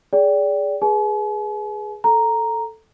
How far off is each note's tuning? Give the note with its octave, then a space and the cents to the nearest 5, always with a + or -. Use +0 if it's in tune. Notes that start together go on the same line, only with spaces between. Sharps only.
G#4 +0 D5 -30 G5 +0
G#4 +0 B4 -25 G#5 +45
A4 +0 A#5 +0